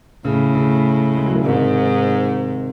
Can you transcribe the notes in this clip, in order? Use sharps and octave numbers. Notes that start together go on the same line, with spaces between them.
A2 C#3
C#3
G#3
F#3
E3
G#2 C3 D#3